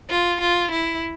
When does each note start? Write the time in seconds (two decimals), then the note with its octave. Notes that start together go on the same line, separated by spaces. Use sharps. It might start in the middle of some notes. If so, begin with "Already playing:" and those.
0.10 F4
0.41 F4
0.71 E4